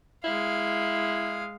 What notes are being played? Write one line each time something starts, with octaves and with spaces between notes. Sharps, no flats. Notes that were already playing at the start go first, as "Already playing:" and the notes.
G#3 E4 F5